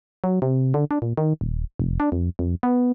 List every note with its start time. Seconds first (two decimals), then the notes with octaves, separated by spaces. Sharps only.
0.24 F#3
0.42 C3
0.74 D3
0.91 D4
1.02 A#2
1.17 D#3
1.41 D#1
1.79 F1
2.00 D4
2.12 F2
2.39 F2
2.63 B3